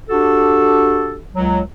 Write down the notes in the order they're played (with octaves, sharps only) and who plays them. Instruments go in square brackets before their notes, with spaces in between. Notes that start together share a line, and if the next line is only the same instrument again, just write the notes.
[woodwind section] D4 F#4 G4 A4
C#2 F#3